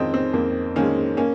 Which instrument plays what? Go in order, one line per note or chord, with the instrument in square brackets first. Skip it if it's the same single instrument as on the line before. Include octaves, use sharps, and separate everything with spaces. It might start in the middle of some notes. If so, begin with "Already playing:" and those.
Already playing: [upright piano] F2 D#3 G#3 C4 C#4 D#4 F4
C4
F2 A#3
D#3 G#3 A#3 C#4
A#3 C#4